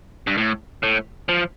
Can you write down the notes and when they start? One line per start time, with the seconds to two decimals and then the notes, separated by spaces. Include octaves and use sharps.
0.27 G2
0.38 A2
0.83 A2
1.29 F3